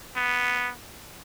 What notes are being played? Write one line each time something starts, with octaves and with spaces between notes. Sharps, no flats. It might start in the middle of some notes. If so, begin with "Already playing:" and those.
B3